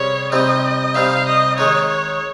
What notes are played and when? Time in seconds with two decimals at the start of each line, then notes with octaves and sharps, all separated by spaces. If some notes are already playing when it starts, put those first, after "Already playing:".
Already playing: C3 G3 C#4 G#4 C#5
0.32 C3 G3 C4 D#4 D#5
0.94 C3 G3 C4 D#4 F5
1.26 D#5
1.57 D#3 G#3 D#4 C#5
1.89 C#5